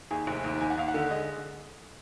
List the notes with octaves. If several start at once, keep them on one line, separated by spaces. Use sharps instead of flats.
D#2 G#4
F1
D#2
D#2 G#5
F#5
D#2 F5
F#5
D3
G#3 D#5